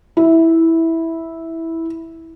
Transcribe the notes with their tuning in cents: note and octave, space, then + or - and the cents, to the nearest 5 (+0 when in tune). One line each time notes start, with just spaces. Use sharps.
E4 -10